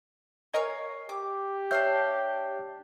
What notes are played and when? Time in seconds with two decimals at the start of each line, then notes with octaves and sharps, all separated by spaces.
0.54 A#4 C#5 D#5 F5 G#5 C#6
1.09 G4 D6
1.71 D4 C#5 E5 F5 F6 G6